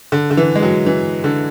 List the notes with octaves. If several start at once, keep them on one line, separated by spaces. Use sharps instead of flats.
D3
D3
E3
G#3
F#3
E3
D3